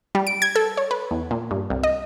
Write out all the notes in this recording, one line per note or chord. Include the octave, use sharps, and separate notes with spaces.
G3
D7
G#6
A4
C#5
B4
E2
A#2
G2
C2
D#5